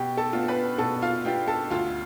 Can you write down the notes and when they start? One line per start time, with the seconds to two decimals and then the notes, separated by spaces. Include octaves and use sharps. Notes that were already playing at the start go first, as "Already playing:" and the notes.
Already playing: B2 G4 G5
0.17 A4 A5
0.33 B3 D4 F4
0.48 B4 B5
0.78 B2 A4 A5
1.02 F4 F5
1.25 B3 D4 F4 G4 G5
1.47 A4 A5
1.70 D2 F4 F5